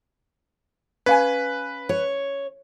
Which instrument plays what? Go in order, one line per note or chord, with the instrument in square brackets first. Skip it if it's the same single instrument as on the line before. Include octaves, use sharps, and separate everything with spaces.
[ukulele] C#4 F5 G#5 [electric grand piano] B4
[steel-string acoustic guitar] C#5